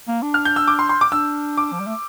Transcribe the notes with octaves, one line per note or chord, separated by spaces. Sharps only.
A#3
D4
F6
G6
E6
D6
C6
C6
D6
D4 E6
D6
F3
G3
A3